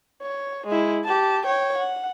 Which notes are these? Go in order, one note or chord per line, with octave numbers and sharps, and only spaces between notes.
C#5
G#3 E4
G4 A5
C#5 G5
F#5